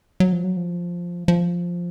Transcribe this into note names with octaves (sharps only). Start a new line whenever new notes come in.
F#3
F3
F#3
F3
F3